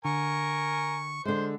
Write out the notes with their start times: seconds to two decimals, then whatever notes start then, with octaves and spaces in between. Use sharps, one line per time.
0.05 D3 A#4 G#5 C#6
1.25 D3 G#3 C5